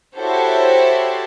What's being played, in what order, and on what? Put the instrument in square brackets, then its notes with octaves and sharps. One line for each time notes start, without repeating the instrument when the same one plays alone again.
[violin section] E4 F#4 G4 A4 C5 C#5